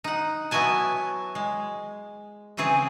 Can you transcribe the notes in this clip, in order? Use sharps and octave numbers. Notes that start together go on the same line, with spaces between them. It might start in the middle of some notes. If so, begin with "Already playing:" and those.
D#4 F#5
F#3 B3 E4 F#4 G#5 A5
G#3
C#3 E3 C4 G#4